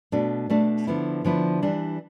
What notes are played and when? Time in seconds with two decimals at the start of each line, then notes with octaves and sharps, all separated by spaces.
0.12 B2 A3 D4
0.50 B2 A3 D4
0.87 D3 F3 B3 E4
1.24 D3 F3 B3 E4
1.62 E3 G3 D4